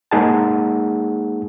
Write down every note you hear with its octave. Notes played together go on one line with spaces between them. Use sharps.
G#3 A#3 D#4 G#4 F#5 A5